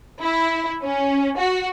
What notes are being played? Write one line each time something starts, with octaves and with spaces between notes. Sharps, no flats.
E4
C#4
F#4